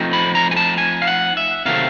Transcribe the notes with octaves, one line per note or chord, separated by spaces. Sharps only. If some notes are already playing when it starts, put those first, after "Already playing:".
Already playing: F3 A3 C4 D#4
B5
A#5
G#5
A5
G#5
F5
F#5
E5
C3 D#3 F#3 A3 C4 F5